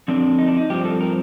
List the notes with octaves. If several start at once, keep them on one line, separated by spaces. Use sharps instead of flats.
F2 D3 F3 C4 D4
D#4
D4
D#4
G2 F3 C4 G4
A4
A#4